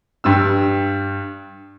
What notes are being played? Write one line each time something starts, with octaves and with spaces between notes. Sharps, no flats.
G2 D4 E6